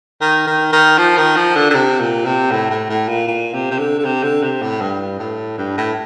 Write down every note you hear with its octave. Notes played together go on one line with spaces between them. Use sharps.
D#3
D#3
D#3
F3
D#3
F3
D3
D3
C3
A#2
C3
A2
A2
A2
A#2
A#2
C3
C3
D3
D3
C3
D3
C3
A2
G2
A2
G2
A2